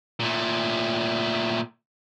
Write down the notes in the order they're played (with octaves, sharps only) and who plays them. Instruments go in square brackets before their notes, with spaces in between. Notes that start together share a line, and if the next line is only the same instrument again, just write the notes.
[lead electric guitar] A#2 A3